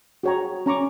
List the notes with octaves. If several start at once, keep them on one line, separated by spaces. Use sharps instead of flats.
F#4 G#4 C#5 G5 A#5
C#4 A#5 C#6 D6